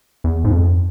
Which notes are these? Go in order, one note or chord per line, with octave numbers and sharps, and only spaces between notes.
E2
G#2
F2